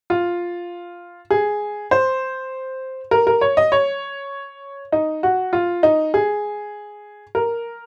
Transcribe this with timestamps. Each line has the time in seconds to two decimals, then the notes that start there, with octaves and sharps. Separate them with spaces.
0.10 F4
1.31 G#4
1.91 C5
3.11 A#4
3.27 A#4
3.41 C#5
3.57 D#5
3.72 C#5
4.92 D#4
5.23 F#4
5.53 F4
5.83 D#4
6.14 G#4
7.35 A#4